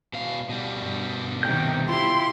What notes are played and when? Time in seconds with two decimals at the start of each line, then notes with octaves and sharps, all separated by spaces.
0.13 B2 F5
0.49 B2 G3
0.81 G2
1.43 C3 D#3 G5 G6
1.89 E4 F4 G4 C6